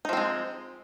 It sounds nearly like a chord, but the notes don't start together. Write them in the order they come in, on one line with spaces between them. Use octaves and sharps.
D#4 F3 C4 G#3